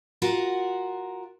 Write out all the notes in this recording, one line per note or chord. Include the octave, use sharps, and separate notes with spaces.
F4 F#4 A#4 F#5